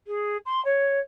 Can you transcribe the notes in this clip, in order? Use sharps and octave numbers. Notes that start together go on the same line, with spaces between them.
G#4
C6
C#5